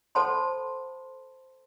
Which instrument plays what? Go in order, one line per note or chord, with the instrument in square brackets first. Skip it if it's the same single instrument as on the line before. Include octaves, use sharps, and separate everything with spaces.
[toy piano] A4 C5 F#5 A5 B5 C6